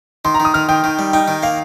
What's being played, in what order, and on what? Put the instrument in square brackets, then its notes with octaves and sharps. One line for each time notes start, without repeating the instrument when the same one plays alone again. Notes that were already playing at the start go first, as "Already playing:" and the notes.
[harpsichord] D#3 [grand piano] C6
[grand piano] A#5
[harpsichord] D#3
[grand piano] D#6
[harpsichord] D#3 [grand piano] F6
[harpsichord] D#3 [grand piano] G5
[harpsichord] D#3
G3
[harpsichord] D#4 [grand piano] G5
[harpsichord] D#3
[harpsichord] A#3 [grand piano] F5